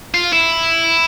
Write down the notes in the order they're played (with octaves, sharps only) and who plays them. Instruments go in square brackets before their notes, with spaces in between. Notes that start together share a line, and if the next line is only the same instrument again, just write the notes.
[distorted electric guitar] F4
E4